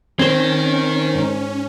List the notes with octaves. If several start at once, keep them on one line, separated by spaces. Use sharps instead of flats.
D#3 C4 C#4 C5 G#6
G#2